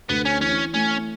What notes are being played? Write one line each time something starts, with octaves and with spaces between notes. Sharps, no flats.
D2 B3
C#4
E3 C#4
A3 C#4